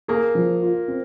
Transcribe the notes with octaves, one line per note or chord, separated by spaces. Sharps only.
A#3 G#4
F3
F4
C4